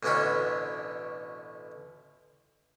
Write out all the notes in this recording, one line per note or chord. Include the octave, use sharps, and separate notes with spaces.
A1 D2 B2 C#4 D4 B5